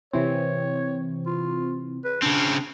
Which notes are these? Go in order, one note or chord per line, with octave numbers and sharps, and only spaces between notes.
C3 E3 C4 C#5
F4
B4
C#3 C4 D4 G#6